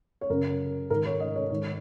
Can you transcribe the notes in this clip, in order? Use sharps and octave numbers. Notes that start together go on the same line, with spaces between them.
C#5
F#2 C#3 A#4
G#2 D#3 A#4
C#5
D#5
C#5
G#2 D#3 C#5